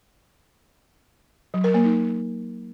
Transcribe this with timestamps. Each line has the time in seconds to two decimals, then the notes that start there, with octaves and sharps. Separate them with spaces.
1.54 F#3
1.64 A#4
1.74 A#3
1.85 D#4